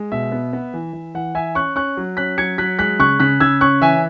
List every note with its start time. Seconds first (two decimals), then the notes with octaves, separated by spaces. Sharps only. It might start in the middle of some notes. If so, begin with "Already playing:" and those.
Already playing: G#3
0.12 B2 E5
0.32 B3
0.53 B3
0.74 E3
0.93 E3
1.14 E3 F#5
1.35 E3 E5 G#5
1.55 C#4 C#6 F#6
1.76 C#4 C#6 F#6
1.97 F#3
2.17 C#4 F#6 B6
2.38 F#3 G#6 C#7
2.58 F#3 F#6 B6
2.79 G#3 F#6 B6
2.99 C#3 C#6 F#6
3.20 C#3 F#6 B6
3.40 C#3 E6 G#6
3.61 C#4 C#6 F#6
3.81 E3 E5 G#5